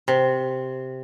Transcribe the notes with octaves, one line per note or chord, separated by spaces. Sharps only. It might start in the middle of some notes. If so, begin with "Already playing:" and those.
C3